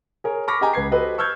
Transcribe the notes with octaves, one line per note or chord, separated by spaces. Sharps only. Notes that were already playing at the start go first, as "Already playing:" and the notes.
G#4 A#4 C#5
B5 C#6 D6 F6 A#6 B6
G4 G#4 D#5 G5 G#5 A#5
C#2 B4 G#6 C7
F#4 G4 A4 B4 C5 D#5
C#6 E6 F6 G6 G#6